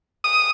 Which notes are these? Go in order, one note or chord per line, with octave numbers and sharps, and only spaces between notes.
D#6